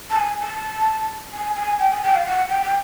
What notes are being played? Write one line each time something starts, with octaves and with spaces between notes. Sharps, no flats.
A5
G#5
A5
G#5
G#5
G5
G#5
G5
F5
F#5
G5
G5